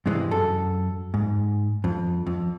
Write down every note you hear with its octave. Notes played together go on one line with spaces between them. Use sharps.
G2 C3 E3 G#3
F#2 A4
G#2
F2
F2